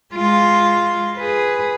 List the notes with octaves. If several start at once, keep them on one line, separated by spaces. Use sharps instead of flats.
G#3 F4
G#4 B4